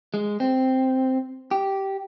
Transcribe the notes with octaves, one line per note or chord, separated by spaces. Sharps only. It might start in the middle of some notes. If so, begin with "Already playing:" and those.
G#3
C4
G4